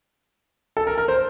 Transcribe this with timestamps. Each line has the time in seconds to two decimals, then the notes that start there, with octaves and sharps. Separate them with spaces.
0.77 A4
0.87 A#4
0.98 A#4
1.08 C5